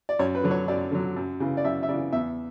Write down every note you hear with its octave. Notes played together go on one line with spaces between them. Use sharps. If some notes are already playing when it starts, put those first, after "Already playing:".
D5
F#2 C#5
B4
D3 F#3
C#5
F#2 D5
D3 F#3
F#2
C#3 E3
D5
F#2 E5
E5
C#3 E3 D5
E2 E5